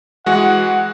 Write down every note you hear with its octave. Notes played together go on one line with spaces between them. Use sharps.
E3 G#3 F#4 F#5